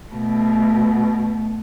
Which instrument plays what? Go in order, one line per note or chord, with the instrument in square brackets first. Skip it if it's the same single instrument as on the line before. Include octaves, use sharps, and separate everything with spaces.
[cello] B2 A3